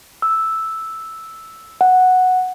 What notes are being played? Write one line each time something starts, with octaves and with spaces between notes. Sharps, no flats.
E6
F#5